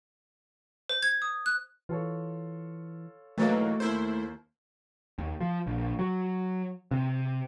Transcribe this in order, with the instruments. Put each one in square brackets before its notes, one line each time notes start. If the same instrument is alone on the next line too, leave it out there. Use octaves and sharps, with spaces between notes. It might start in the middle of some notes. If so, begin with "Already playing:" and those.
[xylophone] C5
G#6
D#6
F#6
[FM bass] E3 [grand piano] F4 A4 C#5
[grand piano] B1 D#4 A6 [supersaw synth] E3 F#3 A#3 [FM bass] A3
[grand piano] D#2 A#3 [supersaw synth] E4 C5
[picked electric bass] D#2
F3
A#1
F#3
C3